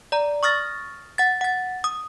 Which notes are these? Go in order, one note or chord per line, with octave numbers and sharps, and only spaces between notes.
D5 A#5
C#6 D#6 F6 A6 A#6
F#5 A6
F#5 A6
D#6